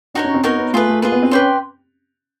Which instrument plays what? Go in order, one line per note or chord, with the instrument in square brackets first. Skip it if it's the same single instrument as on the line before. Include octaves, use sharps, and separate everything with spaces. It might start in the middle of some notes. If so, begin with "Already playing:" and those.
[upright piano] D4 [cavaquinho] D#4 F#4 A#4 C#5
[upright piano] C#4
C4
[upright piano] B3 [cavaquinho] D#4 F#4 A#4 C#5
[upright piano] B3
[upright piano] A3 [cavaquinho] F4 G#4 B4
[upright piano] A3
[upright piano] A#3 [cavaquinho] F4 G#4 B4
[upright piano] B3
C4
[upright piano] C#4 [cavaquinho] B4 D5 G5 C6